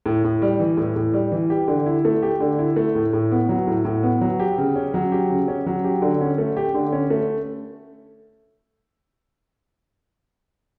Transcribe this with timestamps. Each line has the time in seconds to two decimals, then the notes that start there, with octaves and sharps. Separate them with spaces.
0.06 A2
0.24 A2
0.42 G3
0.60 E3
0.77 A2
0.96 A2
1.13 G3
1.32 E3
1.50 G4
1.68 D3
1.86 E4
2.05 A3
2.23 G4
2.40 D3
2.59 E4
2.76 A3
2.95 A2
3.13 A2
3.32 B3
3.49 F#3
3.67 A2
3.85 A2
4.03 B3
4.21 F#3
4.40 G4
4.58 C#3
4.76 C#4
4.94 F#3
5.12 G4
5.30 C#3
5.48 C#4
5.66 F#3
5.84 G4
6.02 D3
6.21 C#4
6.38 A3
6.57 G4
6.74 D3
6.92 C#4
7.10 A3